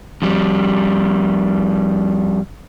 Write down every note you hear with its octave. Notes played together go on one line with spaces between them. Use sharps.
F2 G3